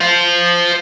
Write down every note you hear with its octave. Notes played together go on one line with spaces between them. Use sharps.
C5 F5